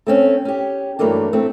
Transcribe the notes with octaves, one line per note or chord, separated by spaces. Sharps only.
A3 C4 C#4
C#4 G4
G2 E3 F#3 A3 A#3 D4
A3 C4